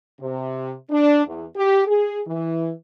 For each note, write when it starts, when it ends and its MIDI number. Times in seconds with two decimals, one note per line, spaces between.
0.21 0.74 48
0.90 1.23 62
1.26 1.45 40
1.56 1.83 67
1.87 2.20 68
2.27 2.71 52